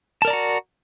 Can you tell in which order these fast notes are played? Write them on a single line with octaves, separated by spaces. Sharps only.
A5 A#4 D5 A#5 F#4